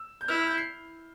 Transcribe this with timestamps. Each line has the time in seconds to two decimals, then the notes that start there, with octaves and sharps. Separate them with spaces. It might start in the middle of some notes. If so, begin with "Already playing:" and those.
Already playing: E6
0.21 G6
0.28 E4 F6
0.38 F6
0.47 G6
0.58 C7